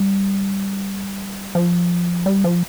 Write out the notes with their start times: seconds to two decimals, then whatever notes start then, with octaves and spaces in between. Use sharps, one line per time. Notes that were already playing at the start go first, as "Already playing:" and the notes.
Already playing: G3
1.55 F3
2.26 G3
2.44 F3